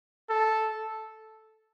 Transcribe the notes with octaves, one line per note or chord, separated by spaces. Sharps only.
A4